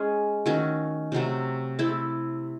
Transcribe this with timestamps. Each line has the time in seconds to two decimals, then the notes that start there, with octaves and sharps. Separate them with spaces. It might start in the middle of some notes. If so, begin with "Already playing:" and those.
Already playing: G#3 C#4 G#4
0.46 D#3 A3 C#4 F#4
1.12 C3 F#3 A3
1.79 A3 C4 E4 A4